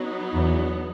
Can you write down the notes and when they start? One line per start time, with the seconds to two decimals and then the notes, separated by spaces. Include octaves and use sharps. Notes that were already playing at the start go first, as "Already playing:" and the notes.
Already playing: F#3 B3 D#4
0.34 E2